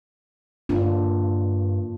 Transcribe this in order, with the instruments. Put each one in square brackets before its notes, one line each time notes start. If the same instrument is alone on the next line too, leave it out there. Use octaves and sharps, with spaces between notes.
[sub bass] G2 [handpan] A#3 D4 F4